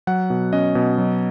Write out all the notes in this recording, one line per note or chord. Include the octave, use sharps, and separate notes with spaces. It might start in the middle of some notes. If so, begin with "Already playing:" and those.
F#3 F#5
B2
C#4 D#5
B2
F#3